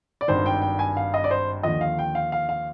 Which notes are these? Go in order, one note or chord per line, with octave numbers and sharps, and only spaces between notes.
D5
G#1 G2 D#3 C5
G5
G5
G#5
F5
D#5
D5
C5
D#2 D3 F3 D#5
F5
G5
F5
F5
F5